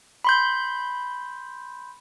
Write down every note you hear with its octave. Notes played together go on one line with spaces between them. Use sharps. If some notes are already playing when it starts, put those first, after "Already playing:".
B5 C6 G6